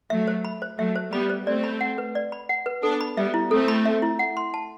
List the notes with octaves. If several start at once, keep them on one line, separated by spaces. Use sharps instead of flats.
F#3 A3 E5
C5
B5
C5
F#3 A3 E5
C5
G3 B3 B5
C5
A3 C4 D5
B5
F#5
B4
D5
B5
F#5
B4
B3 D4 A4
B5
G3 B3 E5
E4
A3 C4 A4
B5
E5
E4
F#5
C6
A5